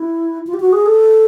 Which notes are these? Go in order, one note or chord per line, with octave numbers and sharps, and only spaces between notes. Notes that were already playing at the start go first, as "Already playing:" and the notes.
Already playing: E4
F4
G4
F#4
G#4
A4